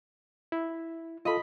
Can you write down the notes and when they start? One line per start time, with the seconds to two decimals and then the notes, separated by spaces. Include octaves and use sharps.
0.52 E4
1.25 F4 A4 D#5 B5